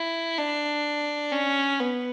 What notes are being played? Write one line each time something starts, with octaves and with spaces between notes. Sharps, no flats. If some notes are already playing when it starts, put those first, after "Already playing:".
Already playing: E4
D4
C#4
B3